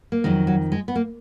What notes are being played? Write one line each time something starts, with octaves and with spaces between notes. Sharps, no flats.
A#3
F2 D#3 F#3 G#3
F#3
G#3
B3
A#3